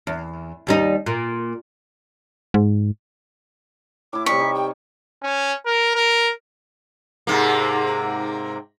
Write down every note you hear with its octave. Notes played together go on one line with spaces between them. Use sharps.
E2
D#2 G3 D#4
A#2
G#2
A2 E4 D6
C3 G3 C#5 C#6 B6
G3 D#4
G5
C#4
A#4
A#4
G#2 C3 A#3